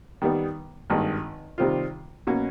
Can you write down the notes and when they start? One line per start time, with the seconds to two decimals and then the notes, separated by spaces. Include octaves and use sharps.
0.22 D#3 G3 B3
0.90 G#1 G2 D#3
1.58 C3 D#3 G3 C4 F4
2.27 B2 F#3 A#3 C#4 F#4